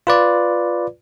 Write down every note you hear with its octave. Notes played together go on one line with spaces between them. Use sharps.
F4 B4 D5